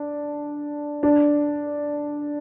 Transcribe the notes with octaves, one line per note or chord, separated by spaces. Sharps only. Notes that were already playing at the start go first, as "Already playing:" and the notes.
Already playing: D4
D4